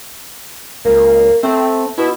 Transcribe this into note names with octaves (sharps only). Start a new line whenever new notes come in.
C#2 A#3
A3 C4
B2 E4